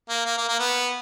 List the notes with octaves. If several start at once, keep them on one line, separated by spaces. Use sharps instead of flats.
A#3
A#3
A#3
A#3
B3